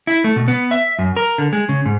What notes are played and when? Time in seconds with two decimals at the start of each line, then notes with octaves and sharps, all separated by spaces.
0.07 E4
0.24 A3
0.36 B2
0.48 B3
0.71 E5
0.99 F#2
1.16 A#4
1.38 D3
1.53 G#3
1.69 C#3
1.86 G#2